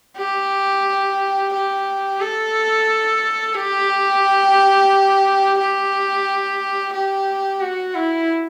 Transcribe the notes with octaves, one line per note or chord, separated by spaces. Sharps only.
G4
G4
A4
G4
G4
G4
F#4
E4